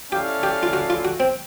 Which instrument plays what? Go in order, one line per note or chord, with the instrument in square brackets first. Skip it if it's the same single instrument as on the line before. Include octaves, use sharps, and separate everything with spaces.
[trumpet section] C#4 E4 A4 D5 F5 [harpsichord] G4
[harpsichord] G4
F4
F#4
F4
F#4
C4